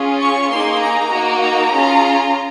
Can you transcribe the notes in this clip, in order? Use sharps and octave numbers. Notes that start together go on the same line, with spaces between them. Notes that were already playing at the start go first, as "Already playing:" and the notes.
Already playing: C#4 F4 G#4
C#6
A#3 D#4 G#4 C6
A#5
A#3 D#4 F#4
A#5
C#4 F4 G#4